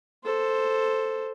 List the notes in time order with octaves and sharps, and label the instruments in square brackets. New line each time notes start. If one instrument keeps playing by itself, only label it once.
[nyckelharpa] A4 C5